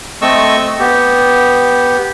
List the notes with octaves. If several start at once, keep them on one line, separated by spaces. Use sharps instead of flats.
A3 C4 A4 D#5 C#6 E6
B3 G4